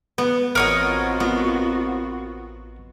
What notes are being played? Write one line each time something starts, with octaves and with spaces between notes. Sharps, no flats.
B3 B4
A1 C4 F4 F#4 A#4 C#5 D#5 F#5
B3